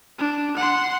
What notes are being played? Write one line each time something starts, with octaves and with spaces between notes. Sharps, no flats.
D4
F#5 C6